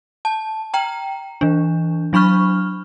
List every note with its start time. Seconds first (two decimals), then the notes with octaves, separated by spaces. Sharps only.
0.25 A5
0.74 G5 A#5
1.41 E3 D4
2.13 F#3 D4 B5 C#6 F6